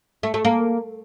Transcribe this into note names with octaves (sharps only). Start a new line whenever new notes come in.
A3
A3
A#3